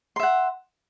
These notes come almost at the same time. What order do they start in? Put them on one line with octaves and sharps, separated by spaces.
C6 E5 F#5